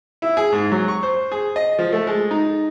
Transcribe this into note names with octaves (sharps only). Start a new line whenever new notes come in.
E4
G#4
G#2
F#3
C#6
C5
G#4
D#5
F3
A3
G#3
D#4